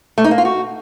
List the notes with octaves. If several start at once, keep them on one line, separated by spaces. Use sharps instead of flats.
A3
D#4
A#3
F4
F#4